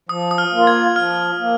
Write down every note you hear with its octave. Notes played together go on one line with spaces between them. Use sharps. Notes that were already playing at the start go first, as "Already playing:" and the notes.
F3 D#6
D#6
F6
A#3 F4
G#6
F3 F6
A#3